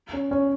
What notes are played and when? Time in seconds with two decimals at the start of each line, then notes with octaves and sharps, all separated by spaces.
0.13 C#4
0.31 C#4